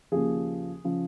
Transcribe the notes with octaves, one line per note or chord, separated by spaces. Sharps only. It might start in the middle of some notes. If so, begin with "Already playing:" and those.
D#2 C#3 F3 G#4
C#3 F3